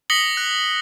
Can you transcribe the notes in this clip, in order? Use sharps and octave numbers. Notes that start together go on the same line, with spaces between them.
D#6 A#6 B6 C#7 F#7 G7
F#6